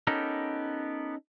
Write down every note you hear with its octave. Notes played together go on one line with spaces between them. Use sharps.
B3 C#4 D#4 G4 A4 A#4